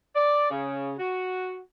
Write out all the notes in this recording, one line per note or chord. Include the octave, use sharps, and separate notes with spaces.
D5
C#3
F#4